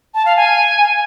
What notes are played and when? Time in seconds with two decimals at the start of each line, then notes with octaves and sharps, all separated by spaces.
0.14 A5
0.25 F5
0.37 G#5